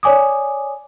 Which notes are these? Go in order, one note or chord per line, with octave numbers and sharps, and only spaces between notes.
C#5 D5 G#5 D6 D#6